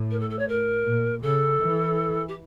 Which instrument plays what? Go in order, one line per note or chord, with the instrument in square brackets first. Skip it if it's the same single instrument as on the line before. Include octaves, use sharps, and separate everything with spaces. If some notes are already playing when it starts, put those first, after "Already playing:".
Already playing: [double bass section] A2
[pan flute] A#4
A4
A4
C#5
A#4
[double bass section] A#2
[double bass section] C#3 [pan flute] A4
[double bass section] E3
[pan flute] G4